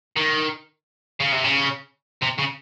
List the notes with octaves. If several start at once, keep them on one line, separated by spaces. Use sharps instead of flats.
D#3
C#3
C3
C#3
C3
C#3